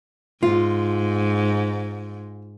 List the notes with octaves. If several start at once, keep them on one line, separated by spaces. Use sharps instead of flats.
G#2 F4